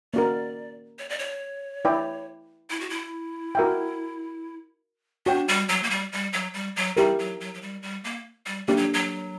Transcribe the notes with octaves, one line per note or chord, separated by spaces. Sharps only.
A#3 C#4 F#4 A#4 D5
C#5
D5
C#5
E4 B4 D5 G5
E4
F#4
E4
F#4 A#4 E5 G5
D4 F#4 C#5 G5
G3
F#3
A#3
G3
G3
F#3
G3
F#3
G3 E4 G4 A#4
F#3
F#3
F#3
G3
G3
A#3
G3
G3 A#3 D4 G4
F#3
F#3